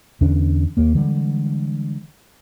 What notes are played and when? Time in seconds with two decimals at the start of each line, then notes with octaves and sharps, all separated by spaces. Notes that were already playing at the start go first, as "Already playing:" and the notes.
0.21 E2 D3 C#4 D4
0.77 D#2 A#3
0.95 D3 E3 G3 G#3